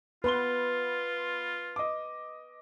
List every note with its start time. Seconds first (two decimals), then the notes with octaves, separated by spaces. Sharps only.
0.24 B3 F4 B4 C6 G7
1.76 D#5 D6